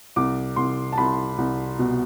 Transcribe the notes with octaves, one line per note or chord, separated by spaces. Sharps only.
C2 D6
C2 C6
A5
C2 B5
C2
B2